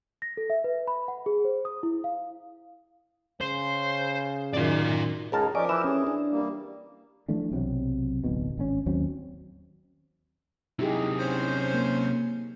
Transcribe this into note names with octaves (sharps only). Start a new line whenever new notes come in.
A#6
A4
E5
B4
B5
F#5
G#4
C5
D#6
E4
F5
C#3 C5
F#2 D#3 F4 D5
C#2 D#4 G#4 A#4 A5
F3 C#4 G4 A#4 D5 D#5 D6
E3 E6
C#4 G#4
D4
G3 A#3
E3 F3 A3 D4
B1 C3 E3 F#3
D1 B1 B2
G#1 D3 C#4
D#2 F#3 C4 C#4
C3 F#3 D#4 E4 G4 G#4
C#4 C5
A#3